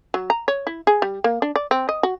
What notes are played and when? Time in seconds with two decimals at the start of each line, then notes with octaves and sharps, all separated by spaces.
0.14 F#3
0.30 A#5
0.48 C#5
0.67 E4
0.87 G#4
1.02 G3
1.24 A#3
1.42 D4
1.56 D5
1.71 C4
1.89 D#5
2.03 F#4